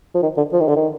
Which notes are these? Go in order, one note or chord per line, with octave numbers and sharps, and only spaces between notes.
F3
D#3
D3
F3
D#3
D3
D#3